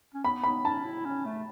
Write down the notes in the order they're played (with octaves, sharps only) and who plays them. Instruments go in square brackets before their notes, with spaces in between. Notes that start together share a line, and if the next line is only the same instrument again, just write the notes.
[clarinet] C#4
[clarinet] B3 [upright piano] B5
[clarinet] B3 [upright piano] B5
[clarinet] C#4 [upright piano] A5
[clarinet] E4
C#4
A3